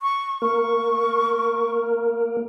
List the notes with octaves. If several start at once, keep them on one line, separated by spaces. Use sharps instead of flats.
C#6
A#3 A#4 C#6